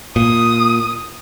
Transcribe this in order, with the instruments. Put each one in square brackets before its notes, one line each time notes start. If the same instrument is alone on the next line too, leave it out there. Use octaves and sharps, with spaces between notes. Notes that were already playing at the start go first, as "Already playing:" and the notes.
[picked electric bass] A#2 [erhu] D#6